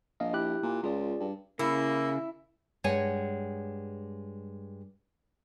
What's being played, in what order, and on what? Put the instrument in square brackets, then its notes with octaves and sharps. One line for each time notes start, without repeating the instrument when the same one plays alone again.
[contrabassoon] A#1 [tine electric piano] D#5 F5
[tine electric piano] E4 G4 F#6
[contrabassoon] A#2
[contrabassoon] C#2 [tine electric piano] F4 G#4 D5
[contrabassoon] G2
[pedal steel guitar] C#3 [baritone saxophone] A#3 [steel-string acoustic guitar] E4 [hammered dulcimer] E5
[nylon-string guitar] G2 G#3 C#5 F#5 G#5